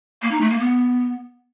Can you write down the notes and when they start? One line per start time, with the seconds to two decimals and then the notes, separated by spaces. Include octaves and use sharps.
0.22 A#3
0.31 D#4
0.41 A3
0.50 A#3
0.59 B3